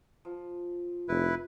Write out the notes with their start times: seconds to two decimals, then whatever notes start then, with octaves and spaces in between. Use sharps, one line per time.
0.25 F3
1.09 F1 E4 B4